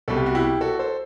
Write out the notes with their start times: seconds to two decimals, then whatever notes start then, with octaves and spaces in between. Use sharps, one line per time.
0.08 C2 B2 G3 A4
0.17 G4
0.26 F#4
0.35 E4 G4
0.61 F#4 A4
0.79 A4 C5